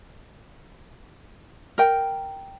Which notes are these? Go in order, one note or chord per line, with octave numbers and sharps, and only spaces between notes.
A#4 G5